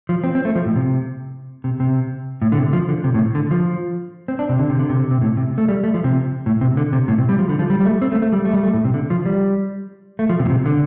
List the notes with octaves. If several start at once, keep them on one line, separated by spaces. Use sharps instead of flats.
F3
C4
C4
A3
F3
A2
C3
C3
C3
A2
D3
C3
F3
D3
C3
A2
D3
F3
C4
D4
C3
D3
C3
D3
C3
C3
A2
C3
A3
G3
A3
F3
C3
A2
C3
D3
C3
A2
C3
G3
F3
D3
F3
G3
G3
A3
C4
A3
A3
G3
A3
G3
A3
A2
C3
D3
F3
G3
A3
F3
C3
A2
C3
D3